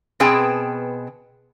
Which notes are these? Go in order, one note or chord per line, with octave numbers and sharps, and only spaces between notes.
B2 B3 C4 G#4 G5 A5